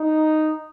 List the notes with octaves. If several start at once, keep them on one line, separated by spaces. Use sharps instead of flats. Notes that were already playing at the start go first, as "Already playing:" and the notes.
Already playing: D#4